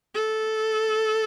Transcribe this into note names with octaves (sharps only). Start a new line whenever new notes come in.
A4